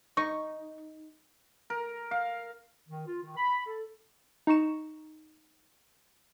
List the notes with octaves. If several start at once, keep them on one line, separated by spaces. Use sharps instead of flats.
D#4 C#6
A#4
F5
D#3
F4
D#3
B5
A4
D#4 A#5 C#6 E7